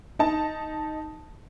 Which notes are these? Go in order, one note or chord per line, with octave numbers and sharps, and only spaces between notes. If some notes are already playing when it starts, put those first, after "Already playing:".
D#4 A5